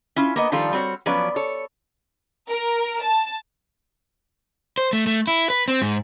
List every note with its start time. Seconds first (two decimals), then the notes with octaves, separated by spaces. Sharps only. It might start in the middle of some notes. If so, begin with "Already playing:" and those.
0.16 C#4 E4 F4
0.36 A#3 B3 D#5
0.52 D#3 F3 G3 F4 A4
0.73 G3 C4 F#4 C#5
1.06 F3 F#3 B3 C#4 B4 D5
1.36 A4 C#5
2.49 A#4
3.02 A5
4.78 C5
4.93 A3
5.07 A3
5.27 E4
5.50 B4
5.68 C4
5.82 G#2